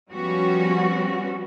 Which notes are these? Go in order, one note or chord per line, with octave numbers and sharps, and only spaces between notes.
F3 G3 B3 C#4 F#4